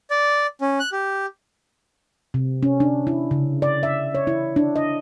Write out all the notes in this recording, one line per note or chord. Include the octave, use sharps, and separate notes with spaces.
D5
C#4
F#6
G4
C3
C#4
D4
E4
C#3
D5
E5
C#5
E4
D4
D#5